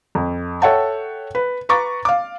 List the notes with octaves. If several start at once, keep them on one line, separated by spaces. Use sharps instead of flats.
F2
A4 C#5 E5 F#5 G5 A5
B4
B4 A#5 C#6 D6 A6
F5 D6